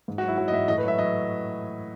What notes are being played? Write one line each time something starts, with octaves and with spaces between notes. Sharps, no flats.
G#2
F#4
F#3 E4
F#3 F#4
D#5
G#2 E5
A2 D#5
B4
F#3 E5
F#3 D#5